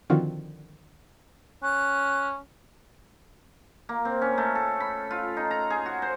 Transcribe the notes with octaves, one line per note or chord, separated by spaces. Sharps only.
D3 D#3 F3 C4 F4 F#4
C#4 F#6
A#3
C4
C#4
A3
A4
B5
F4
D#4
A#5
G#4
F#4
C5